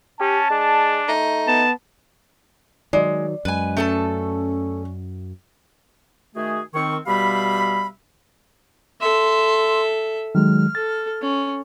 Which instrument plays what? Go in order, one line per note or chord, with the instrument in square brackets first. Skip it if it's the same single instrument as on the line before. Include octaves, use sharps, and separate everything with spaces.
[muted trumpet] C#4 [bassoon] G4 [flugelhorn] A5
[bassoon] G#3 [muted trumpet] D4
[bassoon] A3 [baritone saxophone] D#4
[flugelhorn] B3 [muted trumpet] A5
[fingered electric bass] D#3 F#3 [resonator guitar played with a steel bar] G#3 [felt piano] D5
[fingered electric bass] F#2 [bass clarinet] G#3 [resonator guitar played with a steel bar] B4 G#5
[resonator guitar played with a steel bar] A3 A4 A5 [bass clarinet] C#4
[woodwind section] D#3 A3 F#4 G#4
D#3 C4 C#6
B2 G3 G4 E5 F5 B5
[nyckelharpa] A4 E5 [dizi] C6
[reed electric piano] D#3 F#3 G#3 [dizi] F6
[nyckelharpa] A4 [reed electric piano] A6
[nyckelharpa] C#4